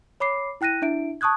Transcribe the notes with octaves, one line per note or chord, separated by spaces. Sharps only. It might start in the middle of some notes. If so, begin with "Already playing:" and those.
C#5 B5 D6 C7
E4 G5 F#6 A#6 D#7
D4 E4 E5 D7
A5 C#6 D#6 F#6 G#6